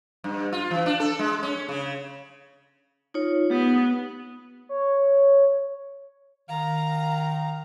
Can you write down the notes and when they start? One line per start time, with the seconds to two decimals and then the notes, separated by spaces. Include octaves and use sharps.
0.24 G2
0.52 F4
0.71 E3
0.86 D4
1.00 A4
1.19 G#3
1.43 C#4
1.69 C#3
3.14 D#4 F4 C#5
3.51 B3 G4 D#6
4.69 C#5
6.49 D#3 F5 A#5